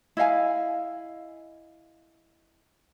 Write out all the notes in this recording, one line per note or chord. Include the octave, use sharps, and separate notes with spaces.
E4 D#5 F5 G#5